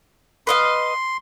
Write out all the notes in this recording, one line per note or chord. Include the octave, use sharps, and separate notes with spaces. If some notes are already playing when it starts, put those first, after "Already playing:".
B4 D#5 F5 C6